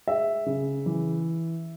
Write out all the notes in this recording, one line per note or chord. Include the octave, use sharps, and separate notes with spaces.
G#3 E5
C#3
E3